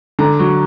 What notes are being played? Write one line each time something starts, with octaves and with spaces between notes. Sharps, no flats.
D3 A#5
F#3